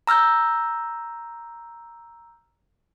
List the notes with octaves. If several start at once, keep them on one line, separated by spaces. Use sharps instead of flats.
A#5 E6 F6 G6